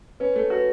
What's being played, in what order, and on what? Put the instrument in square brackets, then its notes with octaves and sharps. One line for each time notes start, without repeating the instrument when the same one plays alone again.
[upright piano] C#4 [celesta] B4
[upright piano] A3
F#4
[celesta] B4